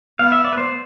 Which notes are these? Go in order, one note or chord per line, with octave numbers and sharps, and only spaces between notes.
B3 F5
E5
D5
B4
C5